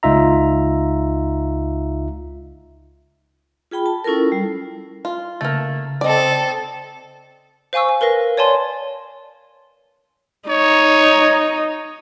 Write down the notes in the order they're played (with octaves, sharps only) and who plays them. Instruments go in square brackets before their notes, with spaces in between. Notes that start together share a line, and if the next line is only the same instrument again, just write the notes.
[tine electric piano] C#2 D#4 F4 E5 A#5
[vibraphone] F4 G#4 G5 B5
A5
C#4 E4 F4 A4 A#4
G3
[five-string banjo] F4
[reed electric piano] C#3 A6 [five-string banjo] A3 A#3
[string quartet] C4 A4 [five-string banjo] D5 D#5
[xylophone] C5 F5 G#5 C#6 E6
G#5
A#4 B4 F5 A#6
C#5 D5 G#5 A5 C6
[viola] D#4 [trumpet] C#5